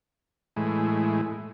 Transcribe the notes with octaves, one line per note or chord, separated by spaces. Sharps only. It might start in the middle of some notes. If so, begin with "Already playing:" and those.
A2 E3 G#3